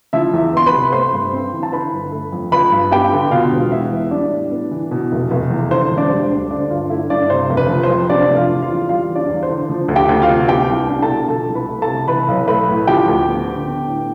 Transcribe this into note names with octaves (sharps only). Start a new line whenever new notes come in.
F3 E4 E5
E2
B3 C6
B4 B5
C3
A3 C5 C6
G2
C4
E3
A5
D3 B4 B5
G1
A3
F2
F3 B4 B5
G2
B3 G4 G5
D3
B2 F4 F5
E1
B3 E4 E5
E2
G3 D4 D5
A2
B3
E3
B2
F1
F1
E2
D3 C5
E1
D4 D5
G3
C5
D2
D3 D4 D5
G1 F4 F5
A3 E4 E5
G2 D4 D5
C3 C5
F1
B4
F3
C5
F2
C3 D4 D5
F1
F4 F5
E3
F4 F5
E2
G3 F4 F5
E2
D4 D5
E2
C5
D3
F3
D2
G4 G5
D2
F4 F5
C3
B3 G4 G5
C2
D4
A4 A5
B2
F3 A4 A5
C2
B4 B5
A3
A4 A5
C3
E3 B4 B5
B1
A3 B4 B5
A2
F3 G4 G5
D2
B3
D3
B3
A2